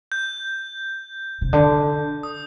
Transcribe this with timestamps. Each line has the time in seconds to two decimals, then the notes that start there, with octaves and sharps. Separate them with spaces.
0.12 G6
1.41 C3
1.53 D3
2.23 D#6